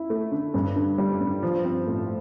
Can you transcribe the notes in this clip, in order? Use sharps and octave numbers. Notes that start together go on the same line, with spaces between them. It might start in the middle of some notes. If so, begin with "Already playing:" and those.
Already playing: E4
A3
D3
G2
D3
G3
G2
F3
C4
A2